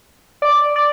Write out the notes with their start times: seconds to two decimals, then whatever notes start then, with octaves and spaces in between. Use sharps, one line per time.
0.42 D5
0.76 D5